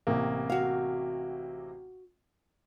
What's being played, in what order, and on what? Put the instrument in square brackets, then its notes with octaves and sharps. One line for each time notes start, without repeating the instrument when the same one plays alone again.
[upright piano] A1 C3 A#3
[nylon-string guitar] F#4 F5